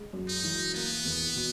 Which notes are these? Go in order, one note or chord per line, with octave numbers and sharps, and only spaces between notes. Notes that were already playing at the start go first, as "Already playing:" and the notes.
Already playing: G#3
F#2
D#4
E3
A#3 B3
E2
B2